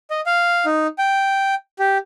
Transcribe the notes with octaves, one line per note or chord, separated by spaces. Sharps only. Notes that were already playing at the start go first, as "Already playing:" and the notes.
D#5
F5
D#4
G5
G4